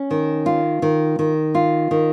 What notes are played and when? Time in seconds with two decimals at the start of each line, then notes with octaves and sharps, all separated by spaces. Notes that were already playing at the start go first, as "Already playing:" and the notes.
Already playing: C#4
0.11 D#3
0.46 F4
0.82 D#3
1.19 D#3
1.55 F4
1.91 D#3